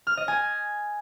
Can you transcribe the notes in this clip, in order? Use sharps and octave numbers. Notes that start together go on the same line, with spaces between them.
F6
D#5
G#5